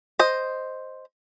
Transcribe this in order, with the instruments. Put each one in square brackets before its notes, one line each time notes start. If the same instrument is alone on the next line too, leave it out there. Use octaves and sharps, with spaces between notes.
[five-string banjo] C5 D#5